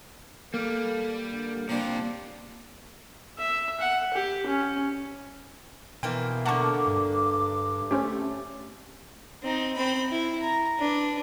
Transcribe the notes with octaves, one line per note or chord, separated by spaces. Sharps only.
G3 A#3 A4
D3
C3 F3 G3 A#3 D4 F4
E5
F#5
G4
C#4
B2 E3 A#3 C5 G5
D3 A#3 F#5 A5 C#6 D6
G2
A3 C4 C#4 G4
C4 D#4
C4 B5
E4
A#5
D4 B4